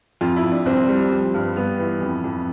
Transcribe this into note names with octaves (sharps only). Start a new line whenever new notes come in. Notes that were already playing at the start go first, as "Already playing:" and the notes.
F2 F4
E4
F2
D4
C2 C4
G3
F3
G2
G3 B3
E3
F2
F2